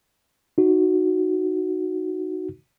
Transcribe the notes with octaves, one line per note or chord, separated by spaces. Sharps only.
D#4 F#4